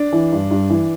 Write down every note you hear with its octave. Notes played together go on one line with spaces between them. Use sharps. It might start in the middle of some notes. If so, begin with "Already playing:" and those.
Already playing: D4
E3
G2
G2
E3